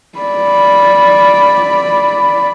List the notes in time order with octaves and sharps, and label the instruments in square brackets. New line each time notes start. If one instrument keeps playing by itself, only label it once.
[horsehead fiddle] D5 B5